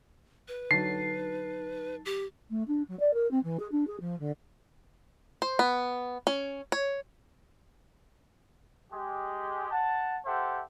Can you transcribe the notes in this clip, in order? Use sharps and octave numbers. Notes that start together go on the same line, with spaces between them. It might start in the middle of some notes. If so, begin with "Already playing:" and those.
B4
D3 F#3 D#4 A5 A6 C7
G4
A3
D4
F#3
D5
A#4
C4
E3
G#4
D4
G#4
F3
D3
C5
B3
C#4
C#5
G#3 G4
F#5 A5
G4 A4 C5 E5 F#5